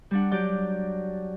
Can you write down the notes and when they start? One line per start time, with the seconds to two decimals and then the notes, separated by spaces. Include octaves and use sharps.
0.11 G3 D4 F#5
0.32 F#3 G4 D5 G6